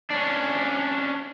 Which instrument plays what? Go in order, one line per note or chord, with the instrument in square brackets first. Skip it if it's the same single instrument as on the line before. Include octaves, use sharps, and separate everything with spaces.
[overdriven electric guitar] C#4 D4